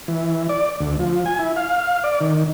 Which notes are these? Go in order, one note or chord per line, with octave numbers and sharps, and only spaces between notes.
E3
D5
D2
F3
G#5
E4
F5
D5
D#3